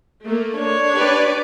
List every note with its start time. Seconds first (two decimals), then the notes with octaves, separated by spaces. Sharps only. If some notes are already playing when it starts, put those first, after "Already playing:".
0.24 A3 A#3
0.55 D4 C#5
0.95 G4 B4 D5